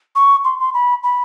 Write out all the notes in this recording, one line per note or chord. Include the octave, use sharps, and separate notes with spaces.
C#6
C6
C6
B5
B5